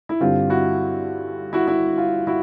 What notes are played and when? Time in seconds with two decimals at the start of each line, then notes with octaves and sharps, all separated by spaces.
0.09 E4
0.20 G2 D3 G3 C4 F4
0.50 E4 F#4
1.53 E4 F#4
1.68 E4
1.98 F4
2.27 E4 F#4